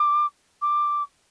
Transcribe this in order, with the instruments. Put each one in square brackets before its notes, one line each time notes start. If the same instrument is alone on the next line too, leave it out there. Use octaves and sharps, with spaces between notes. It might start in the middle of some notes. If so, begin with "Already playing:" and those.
Already playing: [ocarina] D6
D6